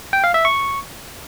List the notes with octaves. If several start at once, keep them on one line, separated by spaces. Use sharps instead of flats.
G5
F5
E5
C#6